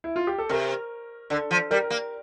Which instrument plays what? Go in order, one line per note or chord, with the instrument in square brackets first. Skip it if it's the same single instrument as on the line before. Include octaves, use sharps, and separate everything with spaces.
[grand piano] E4
F4
G4
A4
[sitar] C3 [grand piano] A#4
[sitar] D3 [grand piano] A4
[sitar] F3
[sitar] G3 [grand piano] A#4
[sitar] A#3